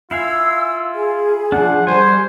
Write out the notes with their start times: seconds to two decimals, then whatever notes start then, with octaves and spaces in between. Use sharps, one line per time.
0.11 E4 F4 F5 G#5 E6
0.94 G#4
1.52 F3 D4 F#5
1.87 G3 C5 G#5